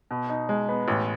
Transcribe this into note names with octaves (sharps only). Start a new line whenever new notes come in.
B2
D#4
G#3
B3
A1